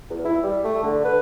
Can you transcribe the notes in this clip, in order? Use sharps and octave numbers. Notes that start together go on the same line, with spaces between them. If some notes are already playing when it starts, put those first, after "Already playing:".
E2
E4
G3
A3
D3
B4